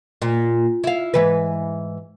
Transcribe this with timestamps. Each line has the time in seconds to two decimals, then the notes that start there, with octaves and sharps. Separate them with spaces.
0.22 A#2
0.84 E4 F5
1.14 G#2 E3 B4